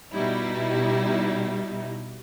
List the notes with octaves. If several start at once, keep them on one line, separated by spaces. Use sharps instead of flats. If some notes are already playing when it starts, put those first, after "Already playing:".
B2 G3 D#4 E4